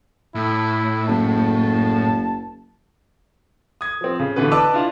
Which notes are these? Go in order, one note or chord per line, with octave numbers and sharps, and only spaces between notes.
A2 E4
F#1 A5
D#6 G#6
F3 C4
C#3
B2 D3 E3 F#4 B4
B4 D5 D#5 A5 D6 E6
D4 E4 F4 F5